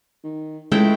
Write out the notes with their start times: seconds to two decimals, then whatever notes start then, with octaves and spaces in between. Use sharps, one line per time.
0.24 D#3
0.72 C#2 G#3 A3 E4 G5